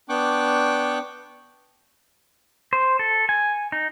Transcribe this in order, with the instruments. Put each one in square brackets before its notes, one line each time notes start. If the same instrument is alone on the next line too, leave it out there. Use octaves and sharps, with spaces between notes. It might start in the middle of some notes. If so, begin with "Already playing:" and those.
[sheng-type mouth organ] B3 D4 G5 C#6 D6 F#6
[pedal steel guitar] C5
A4
G#5
D#4